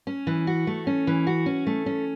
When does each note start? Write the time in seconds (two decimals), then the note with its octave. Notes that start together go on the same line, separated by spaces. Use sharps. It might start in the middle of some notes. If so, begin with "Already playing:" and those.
0.07 C#4
0.27 E3
0.47 F#4
0.67 A3
0.87 C#4
1.07 E3
1.27 F#4
1.46 C#4
1.67 A3
1.86 C#4